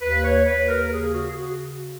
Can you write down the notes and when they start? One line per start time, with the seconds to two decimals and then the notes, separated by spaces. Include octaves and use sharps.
0.01 D#2 B4
0.24 C#5
0.45 D#2 B4
0.68 A#4
0.86 A#4
0.91 C#3 G#4
1.14 F#4
1.29 G#4
1.36 F#4